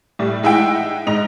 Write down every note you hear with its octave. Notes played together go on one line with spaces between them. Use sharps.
A2 G3
G#3 D#4 E4 E5 F#5 G5
G#2 D#4 D#5 F7